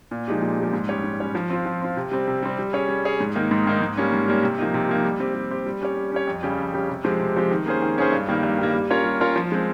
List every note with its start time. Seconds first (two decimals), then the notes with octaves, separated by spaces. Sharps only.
0.11 A#2
0.28 F3 G#3 D#4 G4
0.42 A#2
0.58 F3 G#3 D#4 G4
0.73 G#2
0.88 G3 C#4 G4 C#5
1.04 G#2
1.20 G3 C#4 G4 C#5
1.35 F3
1.50 C4 F4
1.66 F3
1.82 C4 F4
1.97 C3
2.11 G3 C4
2.28 C3
2.43 G3 C4
2.59 G3
2.73 C#4 G#4 C#5
2.89 G3
3.04 C#4 G#4 C#5
3.20 G#2
3.35 D#3 A#3 D#4
3.51 G#2
3.66 D#3 A#3 D#4
3.82 G#2
3.97 G3 A#3 C#4
4.12 G#2
4.28 G3 A#3 C#4
4.43 C3
4.58 F3 A#3 D#4
4.74 C3
4.89 F3 A#3 D#4
5.05 G3
5.20 C4 G4
5.35 G3
5.51 C4 G4
5.66 G3
5.81 C#4 G4 C#5
5.97 G3
6.12 C#4 G4 C#5
6.27 F2
6.43 C#3 G3 C#4 G4
6.59 F2
6.74 C#3 G3 C#4 G4
6.89 C3
7.04 F3 G#3 C4 G4
7.20 C3
7.36 F3 G#3 C4 G4
7.51 D#3
7.66 A#3 C#4 G#4 C5
7.82 D#3
7.97 A#3 C#4 G#4 C5
8.12 G2
8.28 D#3 G3 A#3
8.43 G2
8.58 D#3 G3 A#3
8.74 G3
8.90 C#4 F4 A#4 C#5
9.05 G3
9.20 C#4 F4 A#4 C#5
9.36 F3
9.52 G#3 C4